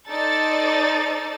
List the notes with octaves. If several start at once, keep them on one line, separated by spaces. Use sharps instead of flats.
D#4 A4 C5 D5 A6